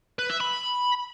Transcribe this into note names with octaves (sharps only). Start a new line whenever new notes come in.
B4
E5
B5